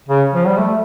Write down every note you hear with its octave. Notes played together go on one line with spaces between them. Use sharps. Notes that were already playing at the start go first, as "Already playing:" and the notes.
C#3
F3
G3
A3